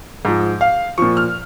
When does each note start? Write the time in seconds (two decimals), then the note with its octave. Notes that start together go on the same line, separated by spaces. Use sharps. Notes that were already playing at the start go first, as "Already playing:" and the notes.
0.25 G#2 F3
0.61 F5
0.98 A#2 F3 C#6
1.17 F6